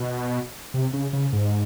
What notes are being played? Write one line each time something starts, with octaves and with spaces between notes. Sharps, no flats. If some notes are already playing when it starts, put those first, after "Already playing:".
Already playing: B2
C3
C#3
C#3
G#2